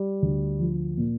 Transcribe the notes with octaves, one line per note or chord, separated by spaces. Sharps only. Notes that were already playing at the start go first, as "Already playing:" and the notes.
Already playing: G3
D2
F3
A#2